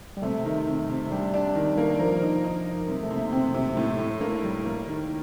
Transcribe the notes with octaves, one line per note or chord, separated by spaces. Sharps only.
G3
C3 A3
D#3
C3
C3
G3 D4
D4
D#3
A#3
F3 A#4
D#4
D#4
D#4
C3 G3
A3
C3
A#3
C3 C4
C3
A2
A2
A#3 D4
G3
A#3
D#3